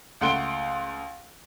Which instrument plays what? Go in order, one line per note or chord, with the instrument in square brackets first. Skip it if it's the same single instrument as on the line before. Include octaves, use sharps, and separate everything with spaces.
[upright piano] C#2 A3 F#5 C6 D7 G7